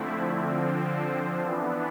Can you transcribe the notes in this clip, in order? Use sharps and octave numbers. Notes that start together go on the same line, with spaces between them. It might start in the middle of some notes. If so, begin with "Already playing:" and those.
Already playing: D3 F3 A3 C4 E4
D3 F3 C4
E3 B3 D4